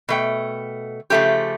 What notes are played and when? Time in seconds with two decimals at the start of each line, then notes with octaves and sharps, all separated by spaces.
0.09 B2 A3 G5
1.10 C#3 F3 A3 C#4 G4